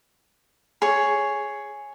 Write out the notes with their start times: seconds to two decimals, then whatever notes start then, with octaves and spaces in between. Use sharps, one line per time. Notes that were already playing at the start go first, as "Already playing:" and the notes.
0.82 G#4 C#5